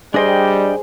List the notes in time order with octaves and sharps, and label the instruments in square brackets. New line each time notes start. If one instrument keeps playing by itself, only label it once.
[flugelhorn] G3 [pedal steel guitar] D4 D#5 G5 [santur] G#4 C5